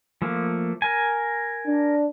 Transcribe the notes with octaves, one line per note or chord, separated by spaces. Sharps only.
F3 A3 A#3
A#4 G#5
D4